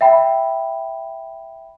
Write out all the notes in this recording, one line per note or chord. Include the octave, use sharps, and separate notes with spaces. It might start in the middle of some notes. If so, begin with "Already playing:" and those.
E5 G5 B5